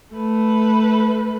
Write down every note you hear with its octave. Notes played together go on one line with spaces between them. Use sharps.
A3 B4